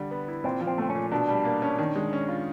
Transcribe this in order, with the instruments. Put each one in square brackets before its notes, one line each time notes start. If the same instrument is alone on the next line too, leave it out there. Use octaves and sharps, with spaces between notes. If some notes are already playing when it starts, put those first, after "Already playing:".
Already playing: [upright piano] D3 G3
B3
E4
[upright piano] A#2 [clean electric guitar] C4
[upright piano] F3
[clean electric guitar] C4
[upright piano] A3 [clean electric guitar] C4
[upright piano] A#2 [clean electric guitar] C#4
[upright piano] B2 [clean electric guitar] D4
[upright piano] G3
A#3
C#4
D#3
G#3
C#4
F4